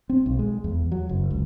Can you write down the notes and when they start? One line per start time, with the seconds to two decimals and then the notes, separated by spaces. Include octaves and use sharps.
0.09 C4
0.26 B1
0.39 G#3
0.64 E2
0.92 F#3
1.09 F#1
1.31 C#2